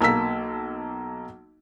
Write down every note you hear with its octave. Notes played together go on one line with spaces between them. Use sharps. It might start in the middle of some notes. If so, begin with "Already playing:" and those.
B1 A#3 A5 E6 B6